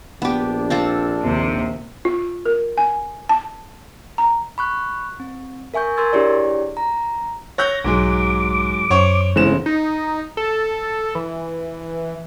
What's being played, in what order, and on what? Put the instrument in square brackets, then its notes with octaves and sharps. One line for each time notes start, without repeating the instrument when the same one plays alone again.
[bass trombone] A#1 [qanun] B3 G4 [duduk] D4
[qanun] C4 F4 A4
[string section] D#2 C3
[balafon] F4
A#4
G#5
A5
A#5
[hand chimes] B5 C#6 F#6
C4
A#4 E5 G#5 C#6 G6
A#4 C6 E6 G#6 A6
D4 E4 G4 G#4 C#5 D5
A#5
[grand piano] C#5 F#6 G6 [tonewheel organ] A#6
[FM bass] B1 [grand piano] G#2 F#3 G#3 [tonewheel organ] D6
[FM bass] F#2 [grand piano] C5 C#5 C#6
[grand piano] G1 C#3 E7 [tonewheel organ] E3 G#3 C4
[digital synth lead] D#4
A4
E3